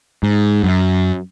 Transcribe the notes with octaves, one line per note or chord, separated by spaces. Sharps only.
G#2
F#2